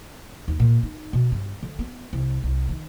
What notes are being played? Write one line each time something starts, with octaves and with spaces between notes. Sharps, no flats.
D#2
A#2
D#4
B2
G2
D3
B3
C2
C2
D#3